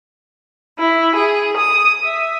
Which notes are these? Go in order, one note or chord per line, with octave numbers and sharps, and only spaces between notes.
E4
G#4
D#6
E5